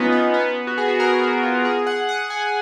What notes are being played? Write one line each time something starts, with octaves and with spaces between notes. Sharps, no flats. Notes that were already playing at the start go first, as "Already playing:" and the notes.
Already playing: B3 C#4 D#4 F4
B3
B3
F#4
G#4
F#4
A#4
F#4
F4
G#4
F#5
F#5
G#5